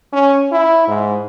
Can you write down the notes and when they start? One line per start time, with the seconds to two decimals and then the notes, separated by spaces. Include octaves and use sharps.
0.13 C#4
0.52 E4
0.88 G#2